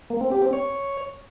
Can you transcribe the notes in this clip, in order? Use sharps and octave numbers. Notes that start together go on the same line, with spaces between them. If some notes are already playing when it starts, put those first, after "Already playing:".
A#3
C4
G4
C4
C#5